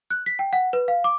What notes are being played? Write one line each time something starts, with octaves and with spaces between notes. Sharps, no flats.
F#6
B6
G5
F#5
B4
F5
D6